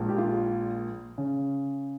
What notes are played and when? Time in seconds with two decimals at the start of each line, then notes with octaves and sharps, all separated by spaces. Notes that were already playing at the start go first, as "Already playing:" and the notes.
Already playing: A#1 A#2 G#3
0.09 G4
0.18 F4
1.18 C#3